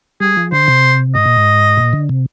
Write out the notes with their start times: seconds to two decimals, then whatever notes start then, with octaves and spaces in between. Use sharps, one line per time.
0.20 G3 G#4
0.37 F3
0.52 D3 C5
0.68 C3
1.15 G#2 D#5
1.26 A#2
1.36 G#2
1.77 A#2
1.93 D3
2.09 C3